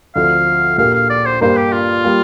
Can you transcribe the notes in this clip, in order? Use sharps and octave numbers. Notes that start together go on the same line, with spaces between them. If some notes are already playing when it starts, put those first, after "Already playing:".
D2 D3 F3 C4 F5
A#1 A#2 A#3 G4 A#4 F5
F5
D5
C5
G2 G3 A#3 D4 A#4 C5
G4
F4
G3 A#3